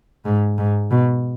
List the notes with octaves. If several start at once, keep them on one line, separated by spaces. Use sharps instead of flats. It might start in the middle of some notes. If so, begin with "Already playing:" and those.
G#2
G#2
B2